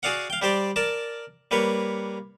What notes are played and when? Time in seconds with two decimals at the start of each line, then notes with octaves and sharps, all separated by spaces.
0.03 F#4 G#4 D5 F5 F#5
0.30 F5 G5
0.42 G3 G4 C5 D5
0.76 A#4 D5 A5
1.51 G3 A#3 B4 C#5